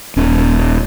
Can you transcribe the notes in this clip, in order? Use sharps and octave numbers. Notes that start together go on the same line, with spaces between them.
D#1 C#4